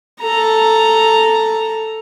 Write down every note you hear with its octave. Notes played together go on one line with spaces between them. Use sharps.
A4 A#5